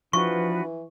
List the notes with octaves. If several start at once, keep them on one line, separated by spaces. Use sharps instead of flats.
E3 F3 D4 F#4 B4 C#6